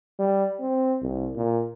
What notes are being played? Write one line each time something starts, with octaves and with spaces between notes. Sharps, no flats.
G3
C4
C2
A#2